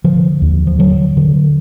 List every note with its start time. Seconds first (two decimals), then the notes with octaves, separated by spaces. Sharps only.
0.04 D3 F3
0.41 D#2
0.67 F3
0.79 D3 F#3
1.17 D3